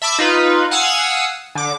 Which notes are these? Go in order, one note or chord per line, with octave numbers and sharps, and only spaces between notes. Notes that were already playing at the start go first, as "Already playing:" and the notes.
E5 A5 B5 D6 E6
D#4 F4 B4
F5 F#5 G#5 D#6 E6
D3 D6